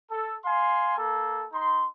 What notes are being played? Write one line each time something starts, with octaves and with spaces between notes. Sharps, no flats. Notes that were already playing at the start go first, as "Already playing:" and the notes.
A4
F5 G#5 C6
A#3 A4
D#4 C6